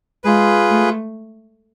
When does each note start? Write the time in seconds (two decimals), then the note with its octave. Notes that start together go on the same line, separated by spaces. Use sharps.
0.24 G#3 F4 G#4 B4
0.71 A3